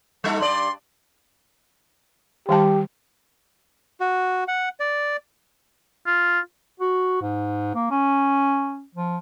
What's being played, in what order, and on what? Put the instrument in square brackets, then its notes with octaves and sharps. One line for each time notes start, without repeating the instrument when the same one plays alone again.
[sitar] G3 D#4 A4
[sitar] G2 D5 [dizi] C6
[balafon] D#3 G3 A5 [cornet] G4
[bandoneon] F#4
F#5
D5
[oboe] F4
[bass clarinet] F#4
G#2
A#3
C#4
F3